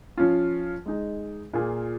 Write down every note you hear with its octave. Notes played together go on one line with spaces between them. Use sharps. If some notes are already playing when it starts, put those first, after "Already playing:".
F3 C#4 F4
G#3 D#4 G#4
A#2 A#3 F4 G#4